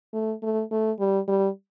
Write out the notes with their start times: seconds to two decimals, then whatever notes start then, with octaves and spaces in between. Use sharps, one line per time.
0.14 A3
0.43 A3
0.72 A3
0.99 G3
1.28 G3